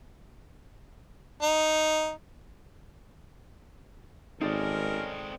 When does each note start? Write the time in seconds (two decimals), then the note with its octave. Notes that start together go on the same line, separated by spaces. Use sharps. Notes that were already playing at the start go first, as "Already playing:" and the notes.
1.43 D#4
4.42 G#1 G#3 C4 C#4 D#4 A4 A#4 D5